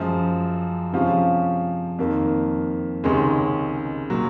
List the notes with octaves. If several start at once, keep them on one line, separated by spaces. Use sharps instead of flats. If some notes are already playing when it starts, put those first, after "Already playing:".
Already playing: F#2 F3 G#3
C3 F3 G#3 C#4 F4
F2 D#3 A#3
C#2 C3 D#3 G#3 C#4
A#2 F#3